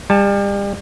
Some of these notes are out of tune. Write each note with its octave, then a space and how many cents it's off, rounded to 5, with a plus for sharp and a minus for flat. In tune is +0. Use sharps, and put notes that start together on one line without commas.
G3 +35 A5 +0